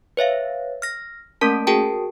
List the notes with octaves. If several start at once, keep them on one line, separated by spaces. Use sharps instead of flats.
B4 C#5 E5 F5
F6 A#6
A3 A#3 C#4 A#4 A5
F#4 G#4 A#4 G5 A5